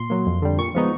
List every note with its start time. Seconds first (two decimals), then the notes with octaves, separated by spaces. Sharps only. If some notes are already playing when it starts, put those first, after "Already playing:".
Already playing: A#2 C6
0.10 F#3 A#3
0.26 F2
0.42 D3 G3
0.58 A#2 C#6
0.75 F3 G#3 B3 D#4